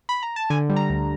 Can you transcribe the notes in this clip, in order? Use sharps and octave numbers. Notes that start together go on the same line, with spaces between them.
B5
A#5
A5
D3 G#5
G3
A#5
D2